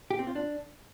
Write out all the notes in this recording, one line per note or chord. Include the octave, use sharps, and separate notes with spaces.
G4
C4
F4
D4